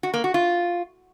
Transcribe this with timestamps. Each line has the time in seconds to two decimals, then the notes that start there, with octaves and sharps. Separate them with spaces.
0.03 F#4
0.14 A#3
0.24 F#4
0.34 F4